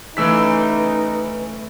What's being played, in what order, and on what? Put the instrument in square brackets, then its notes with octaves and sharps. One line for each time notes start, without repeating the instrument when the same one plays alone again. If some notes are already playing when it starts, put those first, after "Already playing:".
[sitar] C#3 E3 [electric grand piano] A3 E6 B6 [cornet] D#4 [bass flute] B4